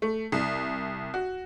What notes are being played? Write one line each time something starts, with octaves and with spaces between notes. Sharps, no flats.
A3
C2
F#4